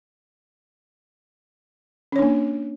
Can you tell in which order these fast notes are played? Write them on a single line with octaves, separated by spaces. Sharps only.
C#4 C#5 D4 A#3